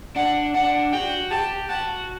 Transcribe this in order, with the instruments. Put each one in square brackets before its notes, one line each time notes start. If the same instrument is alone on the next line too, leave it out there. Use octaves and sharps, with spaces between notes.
[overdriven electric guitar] D4 [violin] F#5
[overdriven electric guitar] D4 [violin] F#5
[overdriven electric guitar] F#4 [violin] G5
[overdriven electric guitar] G4 [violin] A5
[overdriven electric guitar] F#4 [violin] A5